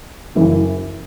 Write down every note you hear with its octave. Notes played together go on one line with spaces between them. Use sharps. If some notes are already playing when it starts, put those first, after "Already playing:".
F#1 F#2 C#3 E3